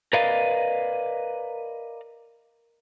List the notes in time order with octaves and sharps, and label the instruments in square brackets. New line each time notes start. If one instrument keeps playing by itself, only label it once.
[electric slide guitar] A#4 B4 D5 D#5 F5